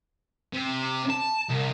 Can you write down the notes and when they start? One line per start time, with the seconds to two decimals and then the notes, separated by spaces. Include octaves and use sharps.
0.54 C3
1.10 A5
1.50 C2